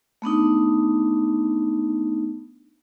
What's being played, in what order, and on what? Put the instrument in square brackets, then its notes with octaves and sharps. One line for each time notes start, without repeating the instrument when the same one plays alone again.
[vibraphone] A3 B3 D4 D#4